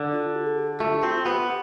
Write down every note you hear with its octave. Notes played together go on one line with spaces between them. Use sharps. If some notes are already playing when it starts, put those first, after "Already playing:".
Already playing: D3
F4
G4
A4
G4
A3 F4
F4
G4
C4 F4
F4
B3 G4